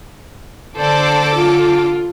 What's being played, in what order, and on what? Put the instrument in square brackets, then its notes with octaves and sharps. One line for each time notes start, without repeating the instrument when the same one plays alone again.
[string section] D3 A4 D6 [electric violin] C5 D5
[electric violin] F4